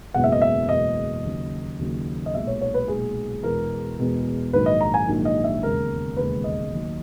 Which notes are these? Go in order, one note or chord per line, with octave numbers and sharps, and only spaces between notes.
F#1 E2 B2 G#3 F#5
E5
D#5
E5
F#1 E2 B2 G#3 D#5
D#2 C#3 F#3
D#2 C#3 F#3
D#5
B1 A#2 G#3 E5
C#5
C#5
B4
B1 A#2 G#3 G#4
E2 B2 G#3 A#4
E2 B2 G#3
A#1 G#2 D#3 F#3 B4
D#5
A#5
G#5
A#1 G#2 D#3 F#3
D#5
E5
E1 D#2 C#3 G#3 A#4
E1 D#2 C#3 G#3 B4
D#5
D#2 D#3 F#3